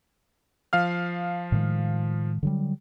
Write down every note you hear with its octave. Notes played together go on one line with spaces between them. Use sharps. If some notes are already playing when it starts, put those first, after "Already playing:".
F3 F5 F6
A2 D#3 G#3
D3 F#3 G3